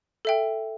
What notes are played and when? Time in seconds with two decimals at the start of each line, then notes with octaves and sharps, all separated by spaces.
0.25 A4 E5 G5